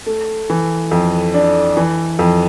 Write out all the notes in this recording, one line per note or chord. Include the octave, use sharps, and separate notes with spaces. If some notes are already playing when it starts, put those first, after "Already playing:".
A3
E3
F2
D4
E3
F2